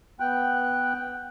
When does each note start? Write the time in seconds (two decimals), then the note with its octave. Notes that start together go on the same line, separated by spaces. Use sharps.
0.20 B3 G5 F#6